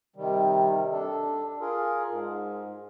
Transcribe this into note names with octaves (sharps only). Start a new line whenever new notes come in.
C3 D#3 G3
D4 A4
F4 G#4 A#4
G#2